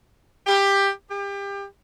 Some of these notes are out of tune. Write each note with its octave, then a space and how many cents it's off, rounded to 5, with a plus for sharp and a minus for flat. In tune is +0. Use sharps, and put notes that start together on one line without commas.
G4 +15
G4 +30